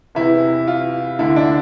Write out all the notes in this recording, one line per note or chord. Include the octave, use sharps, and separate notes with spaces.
E2 C3 E3 E4
F4
D2 D3 E4
D4